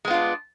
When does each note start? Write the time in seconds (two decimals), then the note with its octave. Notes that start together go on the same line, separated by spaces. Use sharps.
0.05 G#3
0.08 B3
0.11 F4
0.13 D4